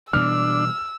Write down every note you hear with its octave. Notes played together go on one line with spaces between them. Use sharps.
B2 E3 G3 D4 E6 F6